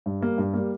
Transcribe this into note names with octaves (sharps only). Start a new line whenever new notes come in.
G2
G3 A#3
G2
G3 A#3